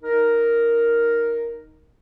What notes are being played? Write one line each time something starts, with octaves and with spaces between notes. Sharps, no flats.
D#4 A#4